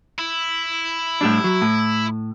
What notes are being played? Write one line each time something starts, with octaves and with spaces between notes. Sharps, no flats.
E4
A2 G3 D4
F#3
A2